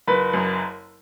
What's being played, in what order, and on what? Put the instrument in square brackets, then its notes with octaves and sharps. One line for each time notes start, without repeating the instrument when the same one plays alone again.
[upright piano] F#1 B4
F#2